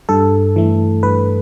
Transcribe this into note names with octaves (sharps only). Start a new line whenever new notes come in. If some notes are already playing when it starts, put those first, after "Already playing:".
G2 A4
E3 A3
G2 B4